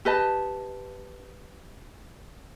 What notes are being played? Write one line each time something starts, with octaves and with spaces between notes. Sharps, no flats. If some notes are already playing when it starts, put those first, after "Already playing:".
G4 B4 D#5 A5